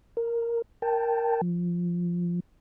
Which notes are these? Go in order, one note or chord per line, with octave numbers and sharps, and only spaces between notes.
A#4
A#4 G5 A5
F3